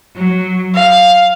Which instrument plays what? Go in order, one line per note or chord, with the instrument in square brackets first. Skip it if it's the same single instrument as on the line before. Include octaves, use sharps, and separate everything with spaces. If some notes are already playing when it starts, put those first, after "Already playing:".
[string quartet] F#3
F5